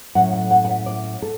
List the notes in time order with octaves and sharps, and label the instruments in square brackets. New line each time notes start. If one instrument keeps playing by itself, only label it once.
[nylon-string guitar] A2 F#3 A3 C#4 F#5
F#5
F#5
F#5
E5
D5
A4